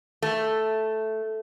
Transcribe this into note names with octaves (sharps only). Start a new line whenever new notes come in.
A3